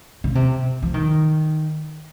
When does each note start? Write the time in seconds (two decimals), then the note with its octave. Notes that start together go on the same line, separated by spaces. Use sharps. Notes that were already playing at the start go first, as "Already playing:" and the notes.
0.24 C#3
0.35 C3
0.82 F3
0.94 D#3